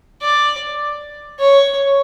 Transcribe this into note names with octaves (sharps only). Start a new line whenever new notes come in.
D5
C#5